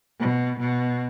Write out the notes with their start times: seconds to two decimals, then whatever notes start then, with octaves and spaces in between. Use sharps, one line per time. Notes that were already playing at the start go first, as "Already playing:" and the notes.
0.20 B2
0.59 B2